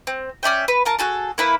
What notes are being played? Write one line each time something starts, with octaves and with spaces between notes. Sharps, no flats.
C4
C#4 D5 E5 G5
B4
F4 A#4 A5
F#4 G#4 A4
A#3 E4 B4